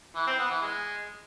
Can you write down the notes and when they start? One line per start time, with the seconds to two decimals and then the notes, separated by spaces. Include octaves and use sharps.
0.15 E3
0.27 C4
0.38 B3
0.50 E3
0.61 G#3